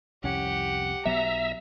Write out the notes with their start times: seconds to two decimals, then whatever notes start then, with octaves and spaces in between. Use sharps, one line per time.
0.24 C2 F2 C#4 G4 F#5
1.05 B1 F#3 B3 E5 A#5